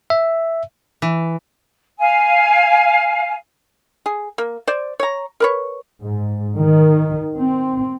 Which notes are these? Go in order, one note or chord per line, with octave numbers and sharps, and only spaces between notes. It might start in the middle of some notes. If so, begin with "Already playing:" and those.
E5
E3
F5 G#5
G#4
A#3
C5 D5
C#5 A#5
A#4 B4 C#5
G#2
D#3
C4